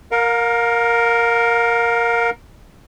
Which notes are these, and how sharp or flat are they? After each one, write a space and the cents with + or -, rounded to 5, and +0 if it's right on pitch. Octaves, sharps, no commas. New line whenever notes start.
A#4 +0 F5 +30